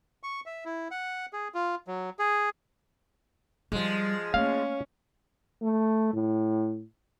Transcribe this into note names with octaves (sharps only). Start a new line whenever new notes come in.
C#6
E5
E4
F#5
G#4
F4
F#3
G#4
F3 G3 G#3
A3 A#3 C#4 F5
A3
A2